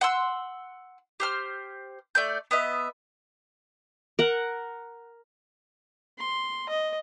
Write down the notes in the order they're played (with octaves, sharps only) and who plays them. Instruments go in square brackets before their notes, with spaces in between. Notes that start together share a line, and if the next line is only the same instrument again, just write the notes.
[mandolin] F#5 C6 E6
G4 C5 F6
A3 D5 G6
B3 D#5 E5
[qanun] A#4 F#5
[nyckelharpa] C6
D#5